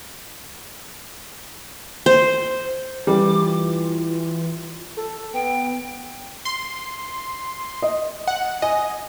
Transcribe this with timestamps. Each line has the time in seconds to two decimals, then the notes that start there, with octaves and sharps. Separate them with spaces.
2.06 C5
3.07 E3 G3 D6
3.44 F4
4.97 A4
5.33 B3 G5
6.45 C6
7.82 D#5
8.28 F#5
8.62 D#5 G#5